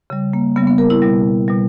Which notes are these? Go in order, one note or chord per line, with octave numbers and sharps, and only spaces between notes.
C#3 G3
A#3
C#3 G3 B3
B3
A#4
E4
B2 G3
B2 G3